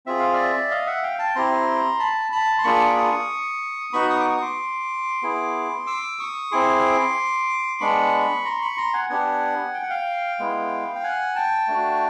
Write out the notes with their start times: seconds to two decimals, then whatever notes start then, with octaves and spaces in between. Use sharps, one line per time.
0.06 C4 F4 G#4 E5
0.20 F5
0.34 D5 E5
0.71 D#5 F5
0.87 E5 F#5
1.03 F5 G5
1.19 G5 A5
1.35 C4 E4 G4 A#5 C6
1.99 A5 B5
2.32 A5 B5
2.59 C6
2.64 A#3 D4 F4 G#4 B5 C#6
2.86 D6
2.97 C#6 D#6
3.93 B3 D#4 F#4 B5 C#6
4.10 C#6 D#6
4.20 D6
4.26 C#6 D#6
4.42 C6 D6
5.23 B3 E4 G#4
5.87 D6 E6
6.19 C#6 D#6
6.52 C4 E4 G#4 C6 D6
7.81 G#3 B3 D4 B5 C#6
8.45 A#5 C6
8.61 B5 C#6
8.77 A#5 C6
8.93 F#5 G#5
9.10 B3 D4 G4 F#5 G#5
9.74 G5
9.83 F#5
9.90 F5 G5
10.39 G#3 B3 E4
10.95 G5
11.03 F#5 G#5
11.35 G5 A5
11.68 A3 D4 F#4